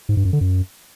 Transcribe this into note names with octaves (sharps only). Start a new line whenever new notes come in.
G#2
G2
F#2
D3
F#2